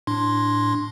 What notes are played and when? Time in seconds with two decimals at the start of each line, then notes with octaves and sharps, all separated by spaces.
0.07 A2 D4 C6